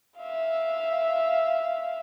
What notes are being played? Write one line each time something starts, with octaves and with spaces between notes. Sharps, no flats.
E5 F5